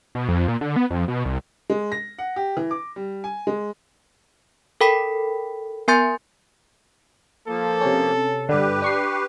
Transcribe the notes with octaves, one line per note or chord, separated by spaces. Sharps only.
B2
F2
A#2
D3
B3
F2
B2
C2
G#3
A#6
F#5
G4
E3
D6
G3
G#5
G#3
A4 A#4 G5 B5 B6
B3 A#4 G#5 C6 G6 A6
F3 A#3 A4
C3 C#4
G2 D3 G4 B4
D4 C#6 C7